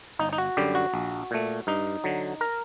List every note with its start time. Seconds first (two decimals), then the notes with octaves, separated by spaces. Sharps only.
0.19 G1 D#4
0.33 D#4
0.38 F#4
0.57 F#2 D3 G3 G4
0.75 F#4
0.94 A#1
1.31 A#2 A3
1.67 G2 D#4
2.04 D3 F#3
2.41 A#4